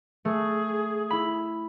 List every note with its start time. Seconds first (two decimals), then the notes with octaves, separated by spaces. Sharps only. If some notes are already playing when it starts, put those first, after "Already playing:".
0.25 A3 G#4
1.10 E4 B5